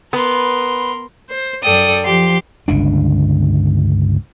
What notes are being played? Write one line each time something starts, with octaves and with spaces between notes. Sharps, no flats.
B3 A#4 B4 C6
C5
F#2 A4 D5 G5 D#6
F3 G4 C6
G1 C#2 D3 D4